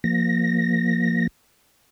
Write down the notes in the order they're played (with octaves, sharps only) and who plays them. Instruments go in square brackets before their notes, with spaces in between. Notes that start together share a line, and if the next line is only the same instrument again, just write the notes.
[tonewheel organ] F3 A#3 A#6